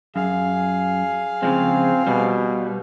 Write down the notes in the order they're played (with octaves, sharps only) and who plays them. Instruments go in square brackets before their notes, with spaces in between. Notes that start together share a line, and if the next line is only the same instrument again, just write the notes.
[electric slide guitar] F#2 [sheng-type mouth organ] G#4 F5
[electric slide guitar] C#3 F3 G#3 [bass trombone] C4
[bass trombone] B2 [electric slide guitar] G3